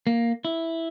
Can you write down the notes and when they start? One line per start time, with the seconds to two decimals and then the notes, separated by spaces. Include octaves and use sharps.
0.07 A#3
0.45 E4